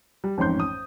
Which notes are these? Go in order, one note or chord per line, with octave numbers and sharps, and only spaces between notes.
G3
A1 F2 G#2 C#5 C6 G6
D#6